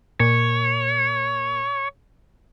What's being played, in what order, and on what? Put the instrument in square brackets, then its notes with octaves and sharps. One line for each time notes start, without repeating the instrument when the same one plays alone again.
[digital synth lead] A#2 [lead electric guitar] C#5